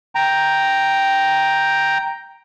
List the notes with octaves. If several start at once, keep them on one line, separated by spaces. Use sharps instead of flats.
G5 A#5